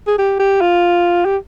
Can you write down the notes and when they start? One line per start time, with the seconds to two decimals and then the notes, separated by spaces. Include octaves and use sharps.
0.07 G#4
0.18 G4
0.39 G4
0.61 F4
1.25 G4